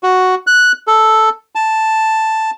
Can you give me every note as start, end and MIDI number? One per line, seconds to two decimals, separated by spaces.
0.03 0.35 66
0.47 0.72 90
0.87 1.29 69
1.55 2.51 81